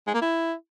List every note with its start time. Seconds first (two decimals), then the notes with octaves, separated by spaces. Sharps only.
0.07 G#3
0.14 A#3
0.21 E4